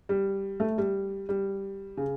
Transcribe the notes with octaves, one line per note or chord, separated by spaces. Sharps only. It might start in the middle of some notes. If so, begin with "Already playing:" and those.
G3
A3
G3
G3
C#3